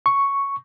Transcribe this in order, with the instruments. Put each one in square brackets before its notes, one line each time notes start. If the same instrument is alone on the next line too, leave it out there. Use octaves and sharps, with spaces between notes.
[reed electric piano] C#6